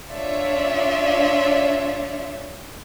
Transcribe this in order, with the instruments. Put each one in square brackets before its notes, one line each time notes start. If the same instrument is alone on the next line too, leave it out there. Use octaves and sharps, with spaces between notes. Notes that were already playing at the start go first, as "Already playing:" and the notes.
[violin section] D4 F4 C#5 D5 E5